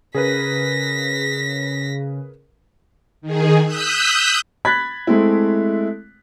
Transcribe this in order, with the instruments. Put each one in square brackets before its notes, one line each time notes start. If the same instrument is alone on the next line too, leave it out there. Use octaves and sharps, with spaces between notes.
[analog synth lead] C#3 [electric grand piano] G#4 A#4 B4 [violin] A#6 B6
[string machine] D#3 G#4
D#6 E6 F#6 G6 B6
[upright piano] B5 F#6 G#6 A6 B6
G#3 A3 C4 E4